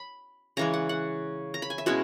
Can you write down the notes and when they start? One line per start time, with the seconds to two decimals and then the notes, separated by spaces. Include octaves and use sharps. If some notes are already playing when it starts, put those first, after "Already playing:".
Already playing: B5
0.57 C#3 E3 G#3 A#5
0.73 F#5
0.89 F#5
1.54 A#5
1.62 B5
1.70 G#5
1.78 E5
1.86 B2 G#3 C#4 E4 D#5